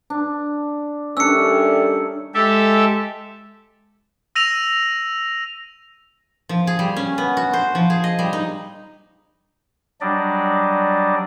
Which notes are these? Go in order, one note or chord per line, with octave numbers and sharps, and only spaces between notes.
D4
D#3 G3 A3 C#4 D4 E6 C#7
G#3 G4 A4 E5
E6 A#6 D#7 F7
F3
G#4
G3
C#4
B3
F#4
C5
F3
G#4
D#5
G3
D#4
F#3 G3 D4 D5 D#5